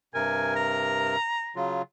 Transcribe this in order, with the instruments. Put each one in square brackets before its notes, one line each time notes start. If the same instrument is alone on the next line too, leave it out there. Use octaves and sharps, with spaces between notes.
[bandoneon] G2 C3 A#4 [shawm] G#5
[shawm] A#5
[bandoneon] C#3 F#3 F4